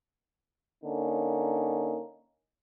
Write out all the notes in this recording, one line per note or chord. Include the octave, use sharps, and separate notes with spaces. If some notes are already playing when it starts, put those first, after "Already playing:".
D3 A#3 C#4 D#4